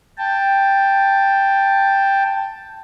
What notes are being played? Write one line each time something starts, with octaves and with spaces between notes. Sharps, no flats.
G5 A5